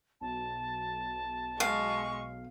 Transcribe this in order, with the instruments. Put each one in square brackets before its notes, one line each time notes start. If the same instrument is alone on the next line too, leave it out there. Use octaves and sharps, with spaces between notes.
[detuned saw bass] B1 [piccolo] A5
[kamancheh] G#3 C#6 [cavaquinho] F5